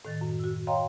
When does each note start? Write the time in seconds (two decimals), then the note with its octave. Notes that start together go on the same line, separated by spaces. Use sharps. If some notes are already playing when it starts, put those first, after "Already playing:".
0.05 A2 D#3 A6
0.21 F#2
0.39 F#4 E6
0.67 C#5 D#5 F5 G5 A#5 C6